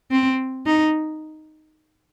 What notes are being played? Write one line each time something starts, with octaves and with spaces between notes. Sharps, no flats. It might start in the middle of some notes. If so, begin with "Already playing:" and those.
C4
D#4